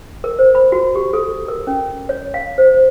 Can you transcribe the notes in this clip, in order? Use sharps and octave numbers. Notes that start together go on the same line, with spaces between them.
A#4
C5
B5
F#4
G4
A4
A#4
C#4
C#5
F5
C5